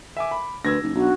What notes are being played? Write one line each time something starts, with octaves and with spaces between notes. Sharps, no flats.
E5 G#5 D6
B5
D2 B4 E6 G#6 A#6
F#1 D#4
B1 D4 F#4